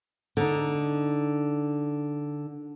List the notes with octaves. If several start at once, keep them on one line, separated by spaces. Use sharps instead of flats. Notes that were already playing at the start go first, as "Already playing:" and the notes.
D3 D#4